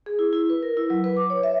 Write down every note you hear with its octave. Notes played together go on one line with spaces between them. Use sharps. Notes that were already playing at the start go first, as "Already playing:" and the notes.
G#4
E4
E4
B4
A#4
E4
F#3
B4
D6
C#5
E5